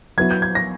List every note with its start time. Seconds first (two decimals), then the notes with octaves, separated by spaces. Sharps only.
0.17 F#3 B3 E4 G#6
0.31 G6
0.42 G#6
0.55 A#6